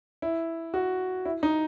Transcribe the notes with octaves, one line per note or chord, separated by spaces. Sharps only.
E4
F#4
E4
D#4